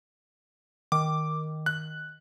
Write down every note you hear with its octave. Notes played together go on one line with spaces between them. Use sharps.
D#3 D6
F#6